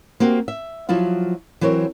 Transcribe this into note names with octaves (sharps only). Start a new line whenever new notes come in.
A#3 C4 F#4 G4
E5
F3 F#3 E4 F4
E3 F#3 C4 A#4 C#5